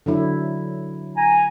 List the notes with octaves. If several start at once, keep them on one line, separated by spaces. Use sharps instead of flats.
D3 F#3 E4
G#5 A#5